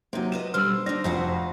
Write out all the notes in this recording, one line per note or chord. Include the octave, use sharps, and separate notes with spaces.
C3 F#3 A#3 D#4 C5
F4 B4 D#5 E7
B2 D3 G3 C5 E6 F6
D4 D#4 D5 A#6
F1 F2 F#4 F5 F#5